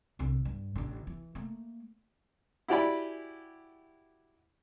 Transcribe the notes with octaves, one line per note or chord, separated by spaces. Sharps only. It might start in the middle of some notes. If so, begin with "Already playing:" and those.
C2 D3
G2
A1 D3
E3
A3 A#3
E4 F#4 G4 D5 G#5 B5